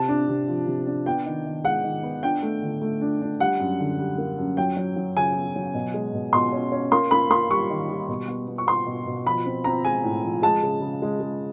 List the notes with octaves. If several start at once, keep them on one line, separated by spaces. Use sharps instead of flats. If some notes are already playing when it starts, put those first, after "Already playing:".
Already playing: C3 A5
D4
C3
F3
C3
D4
B3 G5
D#3
D#3
G#3 F#5
D#3
B3
D4 G5
A3
D3
A3
D4
D4
G3 F#5
F#2
D3
G3
A#3
F#2
F#3 G5
F#3
F#3
C#3 G#5
B3
F#3
B2
G#3
B2
B2 C6
C#4
C#4
A#3 C6
A#3 B5
A#3 C6
G3 C#6
D#3
G3
B2
B3
B3
C#6
B3 C6
B2
B2
F3 B5
C4
C4 A#5
G#3 G#5
A2
F3
G#3 A5
C#3
C#3
G#3
G#3